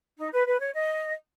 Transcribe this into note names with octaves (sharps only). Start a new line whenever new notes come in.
D#4
B4
B4
C#5
D#5